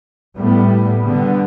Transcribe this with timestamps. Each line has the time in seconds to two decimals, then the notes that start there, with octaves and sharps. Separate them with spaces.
0.37 A2 G3 B3
1.00 D3 G3 B3